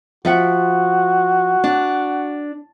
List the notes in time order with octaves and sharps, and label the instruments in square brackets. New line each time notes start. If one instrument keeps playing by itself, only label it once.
[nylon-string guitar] F3 E5 F#5 [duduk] F#4
[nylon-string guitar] D4